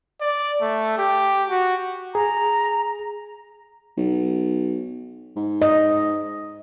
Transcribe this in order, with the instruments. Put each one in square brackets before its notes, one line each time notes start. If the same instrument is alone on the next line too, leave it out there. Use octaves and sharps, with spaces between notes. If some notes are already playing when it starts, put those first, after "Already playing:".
[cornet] D5
A3
G4
F#4
[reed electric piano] G#4 [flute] A#5
[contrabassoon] B1
G#2
[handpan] D#5